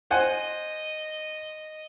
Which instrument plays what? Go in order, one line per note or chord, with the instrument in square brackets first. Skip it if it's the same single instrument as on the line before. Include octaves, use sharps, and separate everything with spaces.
[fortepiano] C5 F#5 G#5 [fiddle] D#5